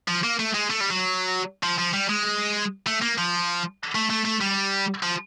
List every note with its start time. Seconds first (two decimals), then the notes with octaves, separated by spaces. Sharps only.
0.08 F3
0.24 A#3
0.39 A3
0.54 G#3
0.70 A3
0.81 G3
0.91 F#3
1.63 F3
1.78 F3
1.94 G3
2.09 G#3
2.87 A3
3.02 A#3
3.18 F3
3.95 A3
4.10 A3
4.25 A3
4.41 G3
5.03 F3